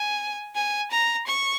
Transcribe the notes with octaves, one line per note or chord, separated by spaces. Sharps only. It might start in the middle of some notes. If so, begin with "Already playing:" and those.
Already playing: G#5
G#5
A#5
C#6